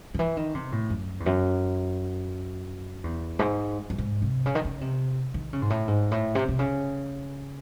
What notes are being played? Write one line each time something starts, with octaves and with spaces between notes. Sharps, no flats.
D#3
E3
D#3
C3
A2
F#2
E2
F#2
E2
G#2
F#2
G#2
C3
C#3
D#3
C#3
C3
D#3
C#3
G#2
A2
G#2
A2
C3
C3
C#3